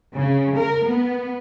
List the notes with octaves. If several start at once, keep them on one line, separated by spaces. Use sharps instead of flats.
C#3
A#4
B3